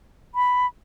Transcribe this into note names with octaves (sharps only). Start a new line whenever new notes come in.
B5